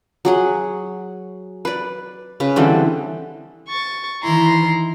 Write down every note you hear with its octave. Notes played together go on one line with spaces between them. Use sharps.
F#3 G#4 F#5
B4 D5
C#3 B4
D3 E3 G3 C4
C#6 A6
D#3 E3 E4 A#5 C6